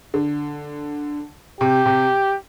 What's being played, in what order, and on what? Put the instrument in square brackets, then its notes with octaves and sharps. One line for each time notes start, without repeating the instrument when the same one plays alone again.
[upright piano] D3
[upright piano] C3 [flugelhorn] G4
[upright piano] C3